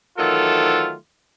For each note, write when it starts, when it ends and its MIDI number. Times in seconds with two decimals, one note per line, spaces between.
0.18 0.94 51
0.18 0.94 52
0.18 0.94 54
0.18 0.94 57
0.18 0.94 65
0.18 0.94 69